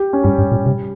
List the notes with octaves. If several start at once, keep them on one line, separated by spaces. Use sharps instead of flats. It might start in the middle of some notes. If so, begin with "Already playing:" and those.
Already playing: G4
C#4
G2 G3
G2
A#2
C3 G3